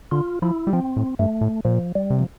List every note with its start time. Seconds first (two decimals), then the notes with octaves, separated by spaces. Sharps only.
0.11 D3 F4
0.42 F3 E4
0.67 G3
0.73 F3 C4
0.97 A2
1.19 G2 A3
1.41 A2
1.65 A#2 F3
1.95 G3
2.10 C3
2.19 F3